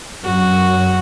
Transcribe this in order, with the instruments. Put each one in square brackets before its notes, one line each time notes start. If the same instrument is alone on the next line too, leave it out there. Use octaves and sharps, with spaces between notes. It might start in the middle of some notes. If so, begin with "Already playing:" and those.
[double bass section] F#2 F#3 [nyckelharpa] F#4